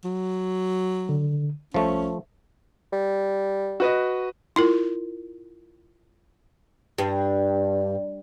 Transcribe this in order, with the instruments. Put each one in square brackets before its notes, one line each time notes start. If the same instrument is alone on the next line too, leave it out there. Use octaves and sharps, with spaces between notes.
[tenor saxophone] F#3
[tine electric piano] D3
[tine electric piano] C2 [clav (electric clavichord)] F3 A3 [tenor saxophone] C#4
[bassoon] G3
[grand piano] F#4 B4 D#5
[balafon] E4 F4 A#4
[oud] G2